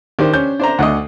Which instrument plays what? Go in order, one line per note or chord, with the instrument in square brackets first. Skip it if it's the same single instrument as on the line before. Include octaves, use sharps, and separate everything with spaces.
[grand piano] D#3 [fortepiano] D4 G4 C5
[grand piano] C#4 G6
[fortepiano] D4 C5 A#5
[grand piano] D2 D4 [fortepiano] D#5 F#5